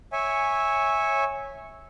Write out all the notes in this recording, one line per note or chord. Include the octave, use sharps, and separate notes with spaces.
C#5 E5 G#5